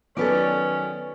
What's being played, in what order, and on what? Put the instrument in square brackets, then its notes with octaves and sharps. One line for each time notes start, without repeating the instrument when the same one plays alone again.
[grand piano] D#3 F#3 B3 [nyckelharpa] C#4 [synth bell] A4 B4 D5